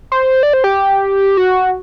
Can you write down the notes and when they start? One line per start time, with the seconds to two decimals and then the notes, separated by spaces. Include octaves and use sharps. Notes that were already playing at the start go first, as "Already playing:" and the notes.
0.12 C5
0.43 D5
0.53 C5
0.64 G4
1.37 F#4